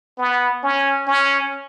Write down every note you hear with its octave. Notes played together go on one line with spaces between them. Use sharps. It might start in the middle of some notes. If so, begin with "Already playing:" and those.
B3
C#4
C#4